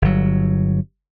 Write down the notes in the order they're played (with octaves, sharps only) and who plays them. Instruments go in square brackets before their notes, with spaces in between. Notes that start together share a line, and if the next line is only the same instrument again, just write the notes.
[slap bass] G1 F#3